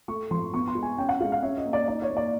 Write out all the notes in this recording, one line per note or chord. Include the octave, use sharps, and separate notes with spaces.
A3 C#6
F3 C6
B3 C#6
C6
G#3
G#5
C#4 G5
F#5
G#3 F5
F5
C#4 E5
D#5
A#3
D5
D#4 D5
C#5
A#3
D5